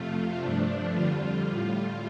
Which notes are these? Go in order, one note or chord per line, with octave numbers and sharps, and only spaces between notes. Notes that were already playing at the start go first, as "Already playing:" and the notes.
Already playing: F2 C3 A3 F4
G2 F3 A3 D4
F2 D3 G3 F4
A2 G3 F4